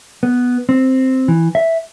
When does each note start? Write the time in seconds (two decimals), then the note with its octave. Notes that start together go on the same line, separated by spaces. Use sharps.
0.23 B3
0.69 C4
1.28 E3
1.55 E5